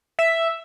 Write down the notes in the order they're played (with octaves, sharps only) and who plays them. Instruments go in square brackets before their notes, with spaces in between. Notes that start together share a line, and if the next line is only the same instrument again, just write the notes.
[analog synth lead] E5